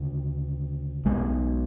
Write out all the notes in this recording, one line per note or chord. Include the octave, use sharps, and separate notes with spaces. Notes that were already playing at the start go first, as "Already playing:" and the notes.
Already playing: D2 C#3
B1 B2 G#3